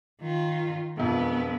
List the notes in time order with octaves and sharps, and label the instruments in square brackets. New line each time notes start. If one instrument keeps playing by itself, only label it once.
[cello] D#3 F4
[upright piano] E1 F2 [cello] B3